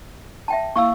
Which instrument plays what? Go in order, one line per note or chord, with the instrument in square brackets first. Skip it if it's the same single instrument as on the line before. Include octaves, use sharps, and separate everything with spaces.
[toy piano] E5 G5 A5
[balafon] A#3 E4 F5 [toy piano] C#6 E6